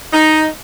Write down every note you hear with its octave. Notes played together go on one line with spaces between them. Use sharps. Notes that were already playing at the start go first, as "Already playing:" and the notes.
D#4